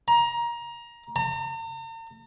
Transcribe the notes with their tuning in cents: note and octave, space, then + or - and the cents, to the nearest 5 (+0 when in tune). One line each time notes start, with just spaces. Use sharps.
A#5 +20
A#5 -45